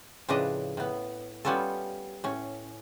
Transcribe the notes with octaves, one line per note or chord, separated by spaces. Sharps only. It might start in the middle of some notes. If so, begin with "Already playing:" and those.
A2 C#3 F3 D4 B4 D#5
A2 B3
G3 B3 C#4 F4 A4
A2 C#4